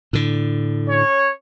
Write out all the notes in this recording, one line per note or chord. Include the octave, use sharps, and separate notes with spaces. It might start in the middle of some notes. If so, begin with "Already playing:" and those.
A2 D3
C#4 C#5